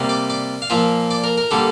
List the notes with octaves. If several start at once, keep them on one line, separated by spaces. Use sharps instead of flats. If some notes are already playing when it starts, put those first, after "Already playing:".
Already playing: C3 G3 A#3
D5
D5
F5
A#2 F3 A#3 E5
D5
A#4
A#4
D3 G3 A#3 A4